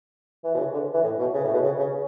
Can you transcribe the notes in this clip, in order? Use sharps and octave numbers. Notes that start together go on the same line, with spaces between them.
E3
B2
C#3
D3
E3
A2
B2
C#3
A2
B2
C#3
C#3